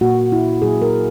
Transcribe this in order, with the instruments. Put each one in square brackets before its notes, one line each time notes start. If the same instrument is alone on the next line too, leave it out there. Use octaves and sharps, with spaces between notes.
[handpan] A#2 A#3 F#4
E4
A#2 F#3 A#3 G#4
A#4